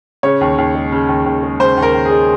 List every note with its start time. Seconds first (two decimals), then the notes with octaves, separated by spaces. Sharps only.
0.23 C#3 C#5
0.41 D#2
0.58 D#2
0.75 G#3
0.92 C#3
1.09 D#2
1.26 D#2
1.43 G#3
1.60 C#3 C5
1.77 D#2
1.82 A#4
1.94 D#2
2.05 G#4
2.11 G#3